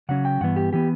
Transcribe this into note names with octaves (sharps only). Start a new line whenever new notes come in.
C#3 F#3 C#4 F#5
G5
G2 E3 B3 F#5
G4
E3 B3 G4